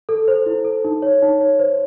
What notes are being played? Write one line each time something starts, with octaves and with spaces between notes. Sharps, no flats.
A4
C5
E4
A4
D#4
C#5
D#4
C#5
C5